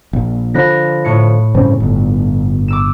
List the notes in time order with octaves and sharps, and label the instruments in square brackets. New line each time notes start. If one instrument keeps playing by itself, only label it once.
[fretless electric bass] A#1
[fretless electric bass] D3 F3 [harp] B5 F#6 A#6
[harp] A2 C#7
[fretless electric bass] G2 C#3 C4
G1
[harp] D6 E6 E7